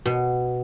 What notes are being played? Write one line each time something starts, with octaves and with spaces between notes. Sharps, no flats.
B2